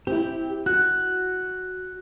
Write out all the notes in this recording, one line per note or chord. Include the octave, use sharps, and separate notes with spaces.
C4 E4 G4
F#4 F#6